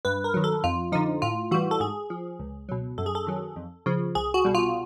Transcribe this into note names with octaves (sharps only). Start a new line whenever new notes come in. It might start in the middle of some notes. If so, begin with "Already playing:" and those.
G2 B4
A#4
D#3 F#3
A4
F2 F4
D3 F3 D#4
A2 F4
E3 G3 F#4
A4
G#2 G#4
F3
C#2
B2 F#3
F#2 A4
G#4
A4
D#3 F#3
F2
C#3 F3
C2 G#4
F#4
B2 G3
F4